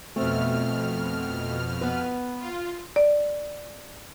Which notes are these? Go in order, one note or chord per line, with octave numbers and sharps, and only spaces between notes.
F2 B2 A3 C4 F6
B3 B4
F4
D5